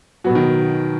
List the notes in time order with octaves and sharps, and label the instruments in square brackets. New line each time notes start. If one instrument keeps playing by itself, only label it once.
[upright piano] B2 B3 F#4 [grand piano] F#3
[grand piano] D#3